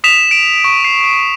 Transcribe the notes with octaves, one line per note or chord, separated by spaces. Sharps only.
D#6 B6 E7 F7
D7
C#6
C7